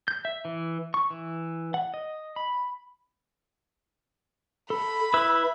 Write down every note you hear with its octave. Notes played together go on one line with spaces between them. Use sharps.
G6
E5
E3
C#6
E3
F#5
D#5
B5
A4 B5
E4 B4 E6